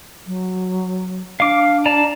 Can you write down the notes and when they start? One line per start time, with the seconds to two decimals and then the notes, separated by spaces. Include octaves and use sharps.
0.27 F#3
1.40 D4 F5 D6
1.86 D5 A5 A#5